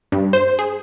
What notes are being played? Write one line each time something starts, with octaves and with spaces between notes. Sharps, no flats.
G2
C5
G#4